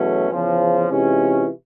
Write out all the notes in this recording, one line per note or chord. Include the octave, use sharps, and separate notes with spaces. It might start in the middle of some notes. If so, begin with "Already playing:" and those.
Already playing: E2 B2 F#3 A3 C#4
E2 C#3 F3
C3 E3 G#3 C#4 F4